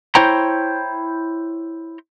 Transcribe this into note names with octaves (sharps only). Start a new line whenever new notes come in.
E4 C5 C#5 G5 A#5